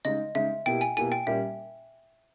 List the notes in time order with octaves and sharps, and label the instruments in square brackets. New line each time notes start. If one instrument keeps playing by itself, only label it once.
[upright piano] C#3 G#3 D#4 [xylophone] D#5
[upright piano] C#3 G#3 D#4 [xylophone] E5
[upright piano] B2 A#3 E4 G4 [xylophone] G5
[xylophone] G#5
[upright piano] B2 A#3 E4 G4 [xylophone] G#5
[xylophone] G5
[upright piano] A#2 G3 A#3 C#4 [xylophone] E5